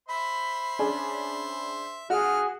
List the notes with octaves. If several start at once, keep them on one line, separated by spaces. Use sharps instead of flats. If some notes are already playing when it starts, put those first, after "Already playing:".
C5 E5 B5 C6
C#4 D4 G#4
D3 F4 F#4 G#4 F6